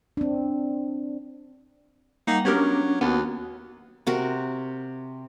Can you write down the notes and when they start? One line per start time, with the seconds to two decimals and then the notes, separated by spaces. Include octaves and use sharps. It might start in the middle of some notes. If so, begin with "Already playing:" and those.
0.17 C4 D4
2.27 G3 A#3 D#4 F#5 A#5
2.45 F#3 B3 C#4 D4 G4 A#4
3.01 D#2 A#3 B3 F#4
4.07 C3 F#4 A#4